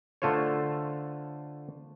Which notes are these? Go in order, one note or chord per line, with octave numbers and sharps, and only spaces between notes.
D3 A3 F4 C5 C#5